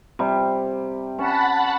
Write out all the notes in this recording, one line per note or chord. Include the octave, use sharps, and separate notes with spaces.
C3 G3
C#4 F#5 A5 B5